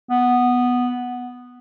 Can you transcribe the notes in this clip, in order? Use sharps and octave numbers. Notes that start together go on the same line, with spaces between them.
B3